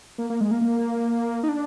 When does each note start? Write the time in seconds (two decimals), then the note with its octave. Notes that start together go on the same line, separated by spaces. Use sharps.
0.18 A#3
0.30 A#3
0.41 G#3
0.51 A#3
0.61 A#3
1.43 D#4
1.49 D4